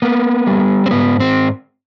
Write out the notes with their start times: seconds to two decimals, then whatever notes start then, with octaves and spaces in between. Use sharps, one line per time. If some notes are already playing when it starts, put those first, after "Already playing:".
0.02 A#3 B3
0.47 G3
0.86 C4
0.91 G#2 B3
1.20 C4